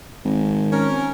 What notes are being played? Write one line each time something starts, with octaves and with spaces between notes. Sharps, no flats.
G#1
C#4 A#4